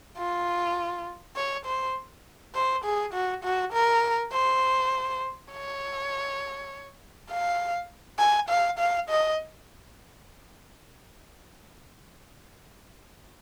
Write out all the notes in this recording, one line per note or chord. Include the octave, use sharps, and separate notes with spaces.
F4
C#5
C5
C5
G#4
F#4
F#4
A#4
C5
C#5
F5
G#5
F5
F5
D#5